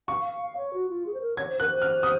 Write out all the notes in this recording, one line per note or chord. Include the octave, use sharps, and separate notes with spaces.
F5 C#6
F5
F5
C#5
F#4
F4
G#4
C5
A#4
C#5 G#6
C5
A#4 F#6
C5
F6
D#6